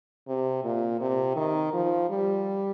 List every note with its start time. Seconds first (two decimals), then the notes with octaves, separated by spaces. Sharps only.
0.28 C3
0.64 A#2
1.01 C3
1.36 D#3
1.73 F3
2.10 G3